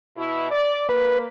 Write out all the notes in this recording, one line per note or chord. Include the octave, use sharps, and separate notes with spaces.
B2 E4
D5
A#3 B4